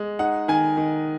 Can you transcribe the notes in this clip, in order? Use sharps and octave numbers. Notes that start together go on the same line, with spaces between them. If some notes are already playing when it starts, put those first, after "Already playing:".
Already playing: G#3
D#4 F#5
D#3 G#5
D#3